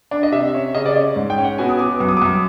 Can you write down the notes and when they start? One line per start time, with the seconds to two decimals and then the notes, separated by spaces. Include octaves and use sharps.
0.11 D4
0.23 D#5
0.32 C3 E5
0.54 C#4
0.74 C#3 D#5
0.86 D5
0.95 C#4 D#5
1.16 G#2
1.30 G5
1.38 C#4
1.44 F#5
1.58 B2 G#5
1.69 D#6
1.79 B2 D6
2.00 F#2 D6
2.08 D#6
2.17 F#2 D6